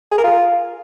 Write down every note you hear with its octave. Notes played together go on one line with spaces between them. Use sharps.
G#4
A#4
F4